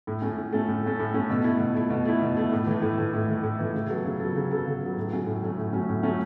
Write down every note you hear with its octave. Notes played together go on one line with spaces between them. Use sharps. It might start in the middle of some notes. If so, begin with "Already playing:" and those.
A2
A3 C#4 A4
A2
A3 C#4 A4
A2
A3 C#4 A4
A2
A3 C#4 A4
B2
A3 E4
B2
A3 E4
B2
A3 E4
B2
A3 E4
A2
E3 A3
A2
E3 A3
A2
E3 A3
A2
E3 A3
C#3
F#3 B3 A4
C#3
F#3 B3 A4
C#3
F#3 B3 A4
C#3
F#3 B3 A4
A2
F#3 A3 C#4
A2
F#3 A3 C#4
A2
F#3 A3 C#4
A2
F#3 A3 C#4